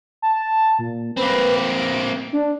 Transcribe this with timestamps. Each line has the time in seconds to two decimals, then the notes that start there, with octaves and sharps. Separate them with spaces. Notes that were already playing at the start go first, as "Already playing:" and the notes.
0.22 A5
0.79 A#2
1.17 A#3 C4 B4
1.69 D7
2.33 D4